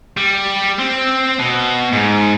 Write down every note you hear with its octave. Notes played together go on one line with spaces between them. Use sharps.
G3
C4
B2
G#2